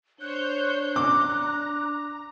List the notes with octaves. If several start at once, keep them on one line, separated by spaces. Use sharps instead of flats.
D4 C5 C#5 F#6 G6
A#5 D6